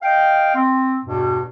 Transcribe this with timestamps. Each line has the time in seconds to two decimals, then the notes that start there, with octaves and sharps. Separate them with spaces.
0.03 D#5 F5 G5
0.55 C4
1.04 E2 G2 B2